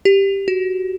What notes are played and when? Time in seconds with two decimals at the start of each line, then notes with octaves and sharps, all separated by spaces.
0.05 G4
0.48 F#4